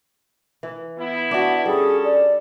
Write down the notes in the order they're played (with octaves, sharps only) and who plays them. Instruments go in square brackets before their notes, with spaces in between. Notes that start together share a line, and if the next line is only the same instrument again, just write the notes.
[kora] E3
[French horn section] B3 E4
[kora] D4 F#4 [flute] E5
[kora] G3 [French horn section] C#4 A4 [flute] G#4
[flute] D5